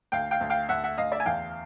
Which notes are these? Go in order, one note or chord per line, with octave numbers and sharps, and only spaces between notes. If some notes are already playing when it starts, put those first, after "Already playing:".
D2 F5 G5
F5 G5
D2
F5 G5
D2 E5 F#5
E5 F#5
D2 D#5 F5
D5 E5
G#5
E2 F5 G5